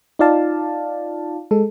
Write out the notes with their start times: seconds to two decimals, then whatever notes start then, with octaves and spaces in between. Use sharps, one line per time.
0.19 D#4 F4 D5 F5 A5
1.51 G#3 A4